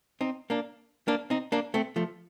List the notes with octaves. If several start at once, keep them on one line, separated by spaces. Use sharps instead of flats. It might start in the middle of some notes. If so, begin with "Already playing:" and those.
C4 D#4
A#3 D4
A#3 D4
C4 D#4
A#3 D4
A3 C4
F3 A3